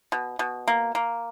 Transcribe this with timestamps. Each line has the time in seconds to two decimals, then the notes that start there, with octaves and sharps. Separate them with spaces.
0.12 B2
0.39 B2
0.68 A#3
0.95 A#3